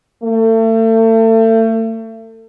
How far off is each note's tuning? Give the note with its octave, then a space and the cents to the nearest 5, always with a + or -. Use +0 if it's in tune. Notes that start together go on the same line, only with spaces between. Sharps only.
A3 +35